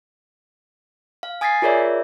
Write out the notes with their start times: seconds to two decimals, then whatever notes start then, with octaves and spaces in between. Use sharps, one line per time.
1.23 F5
1.41 G#5 D#6 G#6 A6 B6 C7
1.62 F4 G#4 A#4 C#5 D5 E5